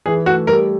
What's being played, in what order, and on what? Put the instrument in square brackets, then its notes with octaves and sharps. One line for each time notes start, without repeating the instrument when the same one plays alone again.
[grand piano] E3 [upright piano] G#4
[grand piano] A3 [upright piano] F#4
[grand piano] G3 [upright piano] A#4